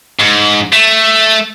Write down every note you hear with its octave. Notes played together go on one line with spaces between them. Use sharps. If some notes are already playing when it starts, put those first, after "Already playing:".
G#2
A3